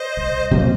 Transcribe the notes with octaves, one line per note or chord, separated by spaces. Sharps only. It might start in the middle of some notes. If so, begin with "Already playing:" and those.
Already playing: C5 D#5
C2
C3 F#3 A#3